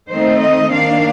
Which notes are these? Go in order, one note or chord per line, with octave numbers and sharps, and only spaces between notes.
D#3 A3 C4 D#4 C5
D#5
D#3 A#3 D4 F5